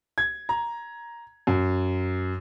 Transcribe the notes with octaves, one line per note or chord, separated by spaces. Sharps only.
G#6
A#5
F#2